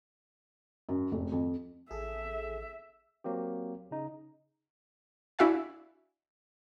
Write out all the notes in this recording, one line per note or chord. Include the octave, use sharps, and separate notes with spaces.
F#2
F1
F2
A1 G#4 A4 E5
F#3 A#3 C4 G4
C#3 D#4
D4 E4 F#4 E5 F5 G#5